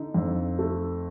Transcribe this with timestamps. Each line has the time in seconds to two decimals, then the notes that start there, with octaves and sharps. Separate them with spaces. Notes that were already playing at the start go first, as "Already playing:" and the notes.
Already playing: D3 D#4
0.14 F2
0.59 A3